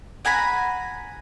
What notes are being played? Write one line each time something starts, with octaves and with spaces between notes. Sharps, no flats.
F#5 G#5 A#5 B5